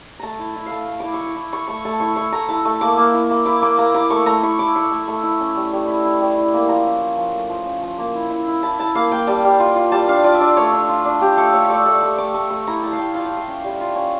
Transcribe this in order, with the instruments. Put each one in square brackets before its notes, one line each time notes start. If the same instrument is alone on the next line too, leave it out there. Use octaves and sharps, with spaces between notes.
[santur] A3 A5 A#5
E4
E4
F5
A3
A3
E4 D6
C#6
E4
D6
E4
E4 C#6
A3 C#6
A3 A5
E4 C#6
E4 C#6
A3 A#5
E4 A5
A3
A#3 D6
A#3
E4
A#3
E4 D6
A#3 D6
A#3 A#5
E4 D6
A3 C#6
A3 A#5
E4 C#6
E4 D6
E4 C#6
A3
A3
E4
C#4
G3
G3
E4
E4
G3
E4
A#3
F3 A#5
C#4
F3
F3
A3
F3
C#4
F3
A#3
E4
E4
E4
E4 A5
E4 A5
A#3 F5
A#3 G5
G3 A5
G3
F4
F4
G3 A5
D4 F5
F4 D5
E5
D4 D5
A3 C#5
D4
F4
D4
F4 G4
A3 A4
A3 C#5
E5
A3 D5
A3 D5
A3 C#6
A3 D6
A3 C#6
A3 C#6
E4 A#5
E4 A5
F5
A3 G5
F4 F5
G5
F4
F5
C#4
G3
F4
C#4